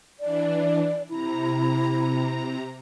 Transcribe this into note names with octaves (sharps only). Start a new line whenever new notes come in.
E3 D4 D5
C3 E4 A#5